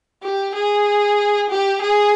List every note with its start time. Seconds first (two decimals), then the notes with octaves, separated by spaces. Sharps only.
0.23 G4
0.54 G#4
1.49 G4
1.81 G#4